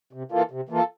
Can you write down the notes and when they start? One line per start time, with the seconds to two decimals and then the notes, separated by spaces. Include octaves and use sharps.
0.13 C3
0.32 E3 A#3 F4 A4
0.51 C3
0.69 E3 A#3 F4 A4